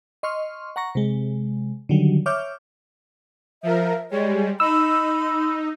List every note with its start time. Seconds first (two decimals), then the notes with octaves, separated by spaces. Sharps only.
0.23 D#5 C6 C#6 F6
0.76 F#5 A#5 C#6 A#6
0.95 C3 G#3
1.89 D3 D#3 F#3 G3
2.26 C#5 E5 D6 F6 G6
3.63 F3 A#4 E5
4.11 G3 G#3 C#5
4.60 D#4 B5 E6